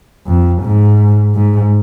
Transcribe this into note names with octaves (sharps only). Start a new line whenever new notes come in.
F2
G#2
G#2